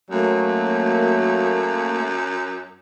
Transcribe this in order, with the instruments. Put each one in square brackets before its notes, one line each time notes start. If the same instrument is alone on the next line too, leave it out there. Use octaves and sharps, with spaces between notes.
[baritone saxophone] F#2 [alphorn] F#3 [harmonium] A3 A#3